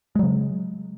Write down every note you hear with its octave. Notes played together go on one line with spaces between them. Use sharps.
C#3 F#3 G#3